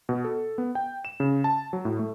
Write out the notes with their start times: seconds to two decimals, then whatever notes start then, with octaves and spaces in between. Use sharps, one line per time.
0.09 B2
0.24 A4
0.58 B3
0.75 G5
1.05 E7
1.20 C#3
1.44 A5
1.73 F#3
1.85 A2
1.99 A3